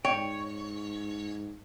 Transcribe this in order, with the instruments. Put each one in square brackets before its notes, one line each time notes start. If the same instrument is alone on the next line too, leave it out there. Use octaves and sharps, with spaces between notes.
[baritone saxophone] G#2 [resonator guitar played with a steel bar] C#5 [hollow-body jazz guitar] G5